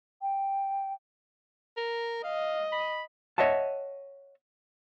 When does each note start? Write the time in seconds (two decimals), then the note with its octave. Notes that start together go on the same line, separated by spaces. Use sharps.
0.22 G5
1.77 A#4
2.24 D#5 F5
2.72 B5
3.38 C#5 D#5 E5 F#5 A5